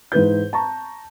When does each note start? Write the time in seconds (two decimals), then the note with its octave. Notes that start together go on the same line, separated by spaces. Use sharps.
0.12 G#2 E3 E4 B4 G6
0.53 A5 A#5 C#6